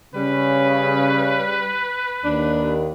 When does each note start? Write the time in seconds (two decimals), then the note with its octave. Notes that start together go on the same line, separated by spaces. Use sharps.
0.15 C#3 G3 B4
2.24 D#2 D4